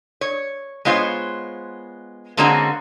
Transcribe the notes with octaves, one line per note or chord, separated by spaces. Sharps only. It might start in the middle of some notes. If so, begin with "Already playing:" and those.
C#5
G#3 B3 F4 C5 C#5
D3 G#3 A#3 C4 C#4 F#4